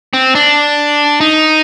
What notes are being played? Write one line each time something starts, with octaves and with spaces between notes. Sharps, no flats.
C4
D4
D#4